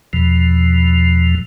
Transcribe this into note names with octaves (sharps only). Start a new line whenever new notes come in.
E2 B2 F3